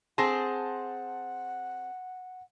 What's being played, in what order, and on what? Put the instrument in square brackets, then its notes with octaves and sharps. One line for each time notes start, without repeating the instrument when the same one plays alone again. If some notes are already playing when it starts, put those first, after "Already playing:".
[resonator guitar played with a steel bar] C4 G#4 [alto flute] F#5 [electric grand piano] A5 C6 A#6